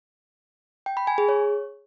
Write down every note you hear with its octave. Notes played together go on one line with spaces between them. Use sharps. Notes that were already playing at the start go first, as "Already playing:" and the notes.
G5
B5
G#5
G#4
C#5